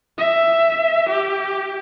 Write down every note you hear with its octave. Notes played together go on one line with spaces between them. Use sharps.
E5
G4